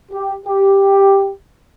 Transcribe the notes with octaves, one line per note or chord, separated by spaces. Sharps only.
G4
G4